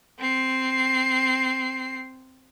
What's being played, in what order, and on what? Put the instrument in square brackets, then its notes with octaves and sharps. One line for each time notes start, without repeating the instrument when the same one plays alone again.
[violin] C4 C7